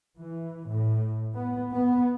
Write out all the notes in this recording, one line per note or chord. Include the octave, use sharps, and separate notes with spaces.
E3
A2
B3
B3